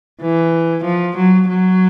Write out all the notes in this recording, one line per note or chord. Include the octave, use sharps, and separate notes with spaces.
E3
F3
F#3
F#3